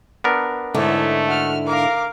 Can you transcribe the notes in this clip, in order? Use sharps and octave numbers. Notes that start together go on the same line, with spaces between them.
B3 D4 A#4
G#2 D3 A3 E4 C#5 D#5
F#4 F6
A#4 F5 D6